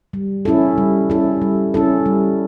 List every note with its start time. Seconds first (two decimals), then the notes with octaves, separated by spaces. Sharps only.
0.13 G3
0.45 C#4 E4 A4
0.78 G3
1.10 C#4 E4 A4
1.42 G3
1.74 C#4 E4 A4
2.06 G3